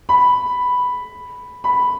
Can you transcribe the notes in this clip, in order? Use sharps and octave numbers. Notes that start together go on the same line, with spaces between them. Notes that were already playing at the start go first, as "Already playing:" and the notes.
B5
B5